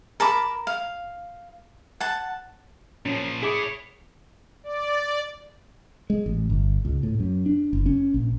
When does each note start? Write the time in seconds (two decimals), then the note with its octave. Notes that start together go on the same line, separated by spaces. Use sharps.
0.20 A#4 A5 B5 D6
0.67 F5
2.00 F#5 A5
3.06 A#2 F3 C#4
3.43 E4 G#4 C#5 D6
4.64 D5
6.10 G#3
6.26 A1
6.50 G1
6.85 C#2
7.03 A2
7.20 F#2
7.46 D4
7.73 F#1
7.86 C#4
8.14 A#1